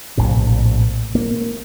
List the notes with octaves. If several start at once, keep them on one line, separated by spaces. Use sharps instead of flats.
A#1 A2 C3
A#3